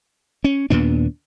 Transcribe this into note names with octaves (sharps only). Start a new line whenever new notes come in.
C#4
D#2 A#2 B3 D4